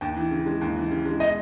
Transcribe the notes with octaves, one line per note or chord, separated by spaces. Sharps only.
D#2 G5
E3
C#3
G#3
D#2
E3
C#3
G#3
B2 D#5